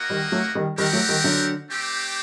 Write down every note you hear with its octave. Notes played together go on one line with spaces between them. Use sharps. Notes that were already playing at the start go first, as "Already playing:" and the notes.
Already playing: A#3 F#4 A#4 D#5 F#5
D#3 G3
F#3 A3
D#3 G3
D#3 G3 C4 G4 A#4 F#5
F#3 A3
D#3 G3
D3 F#3
A3 C4 G4